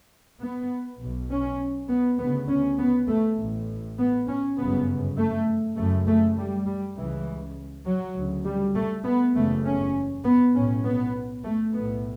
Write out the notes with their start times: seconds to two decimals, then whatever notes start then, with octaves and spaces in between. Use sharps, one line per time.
0.39 B3
0.98 B1 B2
1.29 C#4
1.88 B3
2.18 D2 C#3 B3
2.48 C#4
2.78 B3
3.07 A3
3.38 A1 A2
3.98 B3
4.27 C#4
4.57 G1 F#2 C#3 B3
5.17 A3
5.76 F#1 F#2 C#3 A3
6.06 A3
6.36 G3
6.65 G3
6.96 C#2 C#3 E3
7.85 F#3
8.15 D2 C#3
8.45 G3
8.75 A3
9.05 B3
9.34 F#1 E2 C#3 A3
9.64 C#4
10.24 B3
10.53 A2 C#4
10.58 B1
10.84 B3
11.43 A3
11.73 B1 A2 B3